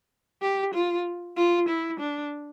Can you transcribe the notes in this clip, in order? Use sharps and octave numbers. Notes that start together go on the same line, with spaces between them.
G4
F4
F4
E4
D4